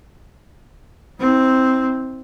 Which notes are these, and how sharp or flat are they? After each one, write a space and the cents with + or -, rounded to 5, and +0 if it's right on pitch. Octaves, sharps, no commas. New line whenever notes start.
C4 +0 E4 -40